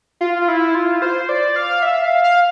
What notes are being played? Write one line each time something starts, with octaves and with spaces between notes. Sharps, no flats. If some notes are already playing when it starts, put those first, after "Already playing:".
F4
E4
F4
C5
D5
F5
E5
F5
F5